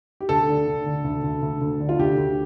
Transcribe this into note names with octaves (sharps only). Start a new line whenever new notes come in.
G4
D2 A4
D3
D2
D3
D2
D2
D2
D2
D3
F4
D2 G4
D2